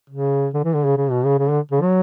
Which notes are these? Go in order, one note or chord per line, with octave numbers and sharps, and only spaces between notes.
C#3
D3
E3
D3
C#3
C#3
B2
C#3
C#3
D3
C#3
F#3